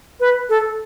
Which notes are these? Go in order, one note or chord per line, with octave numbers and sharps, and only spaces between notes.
B4
A4